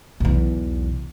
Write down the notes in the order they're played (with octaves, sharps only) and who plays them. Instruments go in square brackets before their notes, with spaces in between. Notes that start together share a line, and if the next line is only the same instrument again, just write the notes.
[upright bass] B1 E2